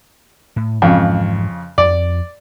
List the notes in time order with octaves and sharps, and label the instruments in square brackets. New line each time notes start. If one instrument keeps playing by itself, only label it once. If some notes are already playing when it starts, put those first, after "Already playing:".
[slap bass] A2
[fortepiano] F2 C#3 [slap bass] G#2 E3 G#3
[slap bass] F2 [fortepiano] D5